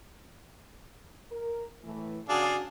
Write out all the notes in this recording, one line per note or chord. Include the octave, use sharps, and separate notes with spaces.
A#4
A2 E3 A3
C#3 D4 F#4 G#4 F5